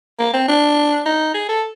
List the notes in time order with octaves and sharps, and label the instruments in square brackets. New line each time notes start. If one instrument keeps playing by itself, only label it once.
[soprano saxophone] A#3
C4
D4
D#4
G#4
A4